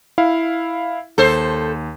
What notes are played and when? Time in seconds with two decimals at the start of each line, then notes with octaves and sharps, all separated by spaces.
0.18 E4 F5
1.18 D#2 A4 C5